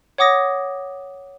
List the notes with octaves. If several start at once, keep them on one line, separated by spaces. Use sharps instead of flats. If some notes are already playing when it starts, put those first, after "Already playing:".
C#5 F#5 D6 D#6 A#6